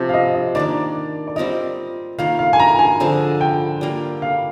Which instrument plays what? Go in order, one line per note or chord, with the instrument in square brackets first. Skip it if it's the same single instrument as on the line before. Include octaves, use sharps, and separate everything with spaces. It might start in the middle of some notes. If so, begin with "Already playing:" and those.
Already playing: [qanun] C3 F3 C4 G4
[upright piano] F5
D#5
D#5
[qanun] D#3 A#3 D4 [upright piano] D5
[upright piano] D5
[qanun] G3 C4 F4 A#4 [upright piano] D#5
[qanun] D#3 A#3 F4 [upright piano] F5
[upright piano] F5
G#5
A#5
G#5
[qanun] D3 F3 G#3 C4
[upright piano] G5
[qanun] G3 A#3 F4
[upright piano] F5